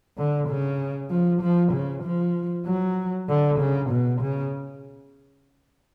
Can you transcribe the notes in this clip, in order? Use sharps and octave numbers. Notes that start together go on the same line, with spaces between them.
D3
C#3
F3
F3
C#3
F3
F#3
D3
C#3
B2
C#3